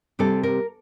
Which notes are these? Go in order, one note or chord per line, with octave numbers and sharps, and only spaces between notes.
C3 G3 C4 A4
A#4